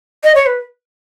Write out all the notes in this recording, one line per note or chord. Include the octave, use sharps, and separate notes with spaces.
D#5
C#5
B4